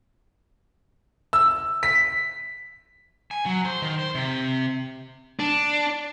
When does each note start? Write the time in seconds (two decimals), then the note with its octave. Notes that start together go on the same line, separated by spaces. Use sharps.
1.33 E6
1.83 B6
3.31 G#5
3.46 F#3
3.65 C5
3.82 D#3
3.99 C5
4.15 C3
5.40 D4